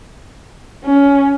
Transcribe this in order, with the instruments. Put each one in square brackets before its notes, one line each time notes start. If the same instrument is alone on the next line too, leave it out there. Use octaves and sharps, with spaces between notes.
[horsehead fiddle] C#4